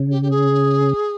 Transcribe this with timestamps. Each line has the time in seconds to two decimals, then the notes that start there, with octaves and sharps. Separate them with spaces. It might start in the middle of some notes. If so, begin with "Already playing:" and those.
Already playing: C#3
0.10 G4
0.22 G4
0.30 G#4